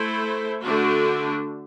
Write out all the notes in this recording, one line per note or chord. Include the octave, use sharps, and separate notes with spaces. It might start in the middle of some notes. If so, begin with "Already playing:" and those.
Already playing: A3 E4 A4 C5
D3 A3 D4 F#4